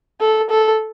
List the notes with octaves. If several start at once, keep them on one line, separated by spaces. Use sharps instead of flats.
A4
A4